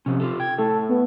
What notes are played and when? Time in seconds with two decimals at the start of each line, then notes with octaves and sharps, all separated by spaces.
0.06 C3 F3 C#4
0.20 F4 G4 A4
0.40 G5 G#6
0.58 A3 E4 A4
0.89 B3